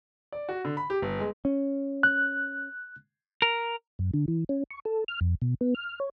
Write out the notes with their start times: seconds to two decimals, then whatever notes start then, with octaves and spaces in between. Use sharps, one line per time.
0.32 D5
0.49 F#4
0.65 D3
0.77 B5
0.90 G4
1.02 G1
1.19 G#3
1.45 C#4
2.03 F#6
3.42 A#4
3.99 F#2
4.14 D3
4.28 E3
4.49 C#4
4.71 C#6
4.85 A4
5.08 F6
5.21 F2
5.42 B2
5.61 B3
5.75 F6
6.00 C#5